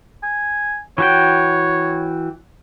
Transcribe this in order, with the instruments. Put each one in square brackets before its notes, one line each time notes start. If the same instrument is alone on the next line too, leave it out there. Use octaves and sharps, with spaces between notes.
[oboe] G#5
[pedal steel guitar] E3 F#4 G5 [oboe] C#5